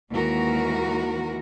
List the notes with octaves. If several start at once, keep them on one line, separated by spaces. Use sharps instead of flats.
D#2 E3 G#3 F#4 A#4